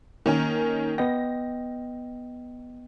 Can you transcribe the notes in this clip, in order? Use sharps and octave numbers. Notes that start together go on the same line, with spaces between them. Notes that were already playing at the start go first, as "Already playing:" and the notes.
D#3 A#3 C#4 A#4
B3 D#5 G5 A#6